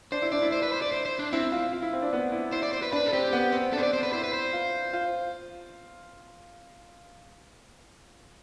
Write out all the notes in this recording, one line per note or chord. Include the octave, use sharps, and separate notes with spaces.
D4 C5
E4
D4 D5
E4
C5
B4
C5
D5
C5
C5
D4
C4 E4
F4
F4
E4
C4
D4
B3
E4
E4 C5
D5
C5
B4
D4 B4
A4
C4 G4
B3
C4
D4 A4 C5
D5
C5
B4
E4 C5
B4
C5
F4
F4